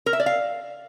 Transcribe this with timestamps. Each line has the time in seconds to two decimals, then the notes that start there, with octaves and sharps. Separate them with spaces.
0.06 A#4
0.13 E5
0.20 D5
0.26 F5